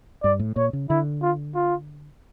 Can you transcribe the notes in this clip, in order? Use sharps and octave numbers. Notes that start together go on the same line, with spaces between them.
G2 D5
A2
A#2 C#5
C#3
D3 E4
F4
F4